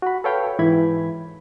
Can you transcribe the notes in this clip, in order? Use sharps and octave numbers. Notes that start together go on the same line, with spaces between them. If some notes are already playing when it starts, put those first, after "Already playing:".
F#4 B5
A4 B4 C#5 F5 G5 B5
G#2 E3 E4 B5 G#6